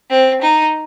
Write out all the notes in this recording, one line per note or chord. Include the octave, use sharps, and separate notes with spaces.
C4
D#4